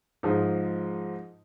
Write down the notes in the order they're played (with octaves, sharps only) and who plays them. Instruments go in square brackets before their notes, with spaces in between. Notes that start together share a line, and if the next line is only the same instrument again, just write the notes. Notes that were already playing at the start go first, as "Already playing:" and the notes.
[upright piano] G#2 F3 G#3 D#4